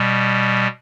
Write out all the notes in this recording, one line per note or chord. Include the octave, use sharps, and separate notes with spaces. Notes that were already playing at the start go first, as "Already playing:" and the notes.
Already playing: B2 G3